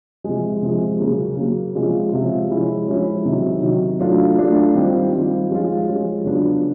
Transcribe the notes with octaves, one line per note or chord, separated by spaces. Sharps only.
C3 F3 G#3
C3 F3 G#3
C#3 F#3 A#3
C#3 F#3 A#3
C3 F3 G#3 C#4 F4
C3 F3 G#3 C#4 F4
F3 G#3 C#4 E4
F3 G#3 C#4 E4
C3 D#3 F#3
C3 D#3 F#3
F#3 A3 D4 F4
F#3 A3 D4 F4
D#3 G3 C4 F4
D#3 G3 C4 F4
F3 G#3 C#4 F4
F3 G#3 C#4 F4
C#3 F#3 B3 D4 F4